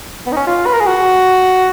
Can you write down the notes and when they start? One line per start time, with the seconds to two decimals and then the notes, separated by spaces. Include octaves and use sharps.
0.27 B3
0.32 D#4
0.37 C#4
0.47 F4
0.66 B4
0.73 A#4
0.80 G#4
0.87 F#4